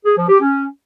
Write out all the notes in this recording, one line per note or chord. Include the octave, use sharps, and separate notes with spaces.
G#4
F3
G4
C#4